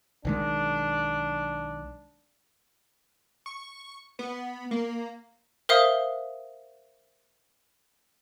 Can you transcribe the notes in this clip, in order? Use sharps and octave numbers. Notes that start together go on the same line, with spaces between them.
B1 D#3 G#3 D4
C#6
B3
A#3
A#4 C5 E5 F5 D#6